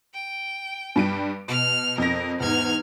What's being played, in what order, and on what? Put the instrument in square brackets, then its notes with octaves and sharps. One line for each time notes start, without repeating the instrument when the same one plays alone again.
[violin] G5
[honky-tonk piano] G2 G3 D7
[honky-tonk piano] B2 [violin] F6
[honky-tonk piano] F2 A#6 [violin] A#4
[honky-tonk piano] E2 G#2 [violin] F6 G#6